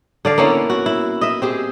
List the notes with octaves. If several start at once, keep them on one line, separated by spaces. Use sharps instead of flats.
D3 D5 F5
A#3 B3 C#4 E4
F#4
E4
D#5 E5
C4 G4 G#4